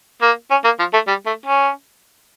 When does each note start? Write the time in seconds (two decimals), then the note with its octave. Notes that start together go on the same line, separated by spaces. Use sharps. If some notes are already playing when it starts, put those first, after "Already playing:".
0.22 A#3
0.51 C#4
0.65 A#3
0.79 F3
0.94 A3
1.08 G3
1.26 A3
1.46 C#4